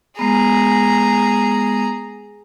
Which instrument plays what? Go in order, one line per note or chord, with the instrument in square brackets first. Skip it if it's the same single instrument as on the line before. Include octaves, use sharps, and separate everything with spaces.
[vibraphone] G#3 B3 [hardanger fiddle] G#4 A#5